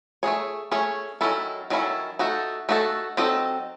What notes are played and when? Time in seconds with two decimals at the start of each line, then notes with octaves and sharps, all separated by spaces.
0.23 A3 C#4 G#4 C#5
0.71 A3 C#4 G#4 C#5
1.21 D#3 F#3 C#4 E4 A4
1.70 D#3 F#3 C#4 E4 A4
2.19 A3 D#4 F#4 A4
2.69 A3 D#4 F#4 A4
3.17 F#3 C4 D#4 A4 D#5